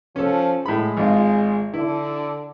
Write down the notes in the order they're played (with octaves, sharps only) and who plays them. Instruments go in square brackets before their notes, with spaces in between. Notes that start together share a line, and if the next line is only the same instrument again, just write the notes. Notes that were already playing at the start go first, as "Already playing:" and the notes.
[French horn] F3 [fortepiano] C#4 A4
[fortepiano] A2 B5 [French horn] G#3
[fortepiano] G#1 F4
[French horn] D3 [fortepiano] E4